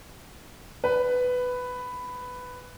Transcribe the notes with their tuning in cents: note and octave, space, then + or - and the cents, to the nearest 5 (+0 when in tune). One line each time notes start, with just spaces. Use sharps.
B4 +10